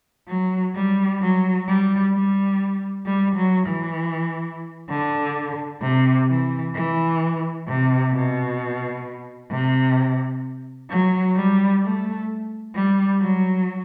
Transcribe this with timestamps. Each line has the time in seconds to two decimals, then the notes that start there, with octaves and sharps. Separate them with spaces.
0.28 F#3
0.75 G3
1.21 F#3
1.67 G3
2.14 G3
3.06 G3
3.36 F#3
3.67 E3
4.90 D3
5.83 C3
6.29 E3
6.75 E3
7.68 C3
8.13 B2
9.51 C3
10.90 F#3
11.36 G3
11.83 A3
12.75 G3
13.21 F#3